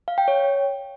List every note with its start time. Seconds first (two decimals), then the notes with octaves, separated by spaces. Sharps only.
0.08 F5
0.18 G5
0.28 C#5